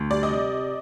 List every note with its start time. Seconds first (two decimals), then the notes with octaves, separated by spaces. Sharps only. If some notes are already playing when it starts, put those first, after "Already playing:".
Already playing: D2
0.10 G3 D5
0.23 D#5
0.30 C3